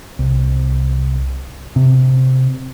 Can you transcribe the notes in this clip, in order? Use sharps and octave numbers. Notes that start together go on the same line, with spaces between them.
C2
C3